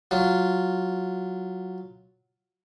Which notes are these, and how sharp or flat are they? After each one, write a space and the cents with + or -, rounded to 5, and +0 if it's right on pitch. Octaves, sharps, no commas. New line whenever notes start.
F#3 +0 F4 +0